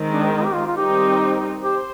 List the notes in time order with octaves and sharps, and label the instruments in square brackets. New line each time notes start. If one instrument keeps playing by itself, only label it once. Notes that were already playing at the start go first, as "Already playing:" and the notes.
Already playing: [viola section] D#3 G#3 C4
[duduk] D4
D#4
G4
F4
F4
[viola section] D#3 G3 C4 D#4 [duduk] G4
[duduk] G4 [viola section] C5